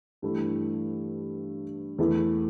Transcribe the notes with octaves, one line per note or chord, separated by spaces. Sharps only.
G2 E3 A3 E4 G4
E2 E3 A3 E4